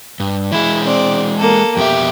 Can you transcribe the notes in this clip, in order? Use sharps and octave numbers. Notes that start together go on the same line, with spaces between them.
G2
E3 G#3 E4 G#4
C4 D5
A#3 A4
F2 B2 G4 E5